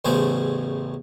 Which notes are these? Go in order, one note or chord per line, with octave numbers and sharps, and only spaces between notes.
A1 E2 A2 C#3 A3 C5